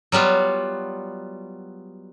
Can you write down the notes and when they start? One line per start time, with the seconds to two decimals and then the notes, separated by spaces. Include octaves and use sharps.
0.12 F#3 G3 B3 F4